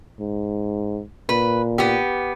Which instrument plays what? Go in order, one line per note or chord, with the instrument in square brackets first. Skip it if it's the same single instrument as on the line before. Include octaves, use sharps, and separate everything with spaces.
[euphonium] G#2
[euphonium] A#2 [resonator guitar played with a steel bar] B4
[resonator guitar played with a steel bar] B3 G4